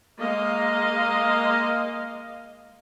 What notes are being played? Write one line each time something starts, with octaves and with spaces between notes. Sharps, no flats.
G#3 A#3 D#5 F5